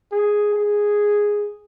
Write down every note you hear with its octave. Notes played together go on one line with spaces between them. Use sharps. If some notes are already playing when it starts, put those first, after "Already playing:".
G#4
G#4